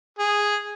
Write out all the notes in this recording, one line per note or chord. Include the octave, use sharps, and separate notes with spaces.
G#4